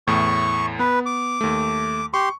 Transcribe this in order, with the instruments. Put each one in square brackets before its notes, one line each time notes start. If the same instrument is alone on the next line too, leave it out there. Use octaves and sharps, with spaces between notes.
[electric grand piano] E2 A2 [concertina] C#6
[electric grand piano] B3 [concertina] B4
[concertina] D6
[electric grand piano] D#2 A3
[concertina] G4 C6 [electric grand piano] C#6